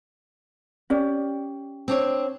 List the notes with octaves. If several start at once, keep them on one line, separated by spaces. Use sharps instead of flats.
C#4 G4 D5
C4 D4 C#5